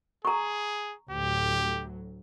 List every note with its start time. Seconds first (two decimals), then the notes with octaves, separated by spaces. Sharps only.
0.25 G#4 A#5 C#6
1.11 D2 A2 F#3 G4